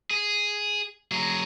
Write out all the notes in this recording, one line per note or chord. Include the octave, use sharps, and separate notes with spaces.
G#4
F#3 G#4